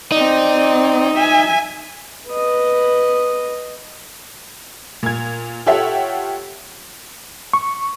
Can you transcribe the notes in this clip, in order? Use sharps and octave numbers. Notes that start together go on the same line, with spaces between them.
C4 D#4 D5
E5 G#5
B4 D#5
A#2 G#6
F4 G4 A4 C#5 E5 F#5
C#6